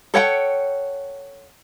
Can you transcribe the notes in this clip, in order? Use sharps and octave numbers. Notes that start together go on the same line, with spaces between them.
A4 C#5 F#5 G5